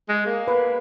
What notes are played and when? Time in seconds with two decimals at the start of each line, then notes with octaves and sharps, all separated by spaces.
0.09 G#3
0.26 A#3
0.48 B4